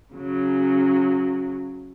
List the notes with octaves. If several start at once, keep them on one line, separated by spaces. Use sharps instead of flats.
C#3 F#3